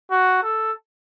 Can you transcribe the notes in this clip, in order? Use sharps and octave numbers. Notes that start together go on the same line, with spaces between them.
F#4
A4